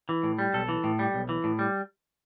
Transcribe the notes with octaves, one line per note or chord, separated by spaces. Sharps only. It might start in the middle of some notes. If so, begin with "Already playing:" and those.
E3
A2
G3
B1 A4
E3
A2
G3
B1
E3
A2
G3